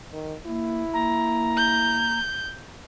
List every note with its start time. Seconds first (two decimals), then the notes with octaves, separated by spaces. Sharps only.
0.13 D#3
0.47 A#3 E4
0.94 A#3 A#5
1.56 G6